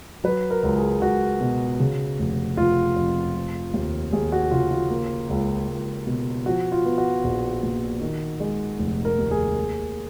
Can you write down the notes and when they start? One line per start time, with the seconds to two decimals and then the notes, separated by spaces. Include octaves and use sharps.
0.24 F#3 B4
0.51 A#4
0.63 C#2
0.77 G#4
1.01 C#2 F#4
1.41 B2
1.80 C#3
2.19 F1
2.57 F1 F4
2.96 F2
3.35 F3
3.73 D#2
4.12 D#2 G#4
4.32 F#4
4.51 C#3 F4
4.71 F4
4.90 A#3
5.30 C#2
5.68 C#2
6.07 B2
6.46 F3 F#4
6.72 F4
6.86 B3
6.98 F#4
7.24 A#1
7.63 A#2
8.01 D#3
8.40 G#3
8.79 F1
9.05 A#4
9.18 D#2
9.31 G#4
9.56 A#3